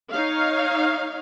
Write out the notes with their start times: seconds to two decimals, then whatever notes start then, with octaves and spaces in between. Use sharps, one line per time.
0.12 D#4 C#5 F5